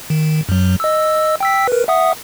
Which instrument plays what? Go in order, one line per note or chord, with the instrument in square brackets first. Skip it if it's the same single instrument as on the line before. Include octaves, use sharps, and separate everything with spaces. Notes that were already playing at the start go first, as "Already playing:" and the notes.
[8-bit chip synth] D#3
F#2 F#3
D#5 E6
G5 E6 B6
A#4 B4
E5 F#5 D#6